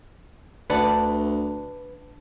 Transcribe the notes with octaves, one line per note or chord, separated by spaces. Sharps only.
D2 D4 B4 D5 F#5